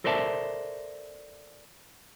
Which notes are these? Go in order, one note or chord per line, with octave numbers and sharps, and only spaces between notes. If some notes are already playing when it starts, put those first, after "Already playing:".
A4 A#4 C5 D5 E5 A5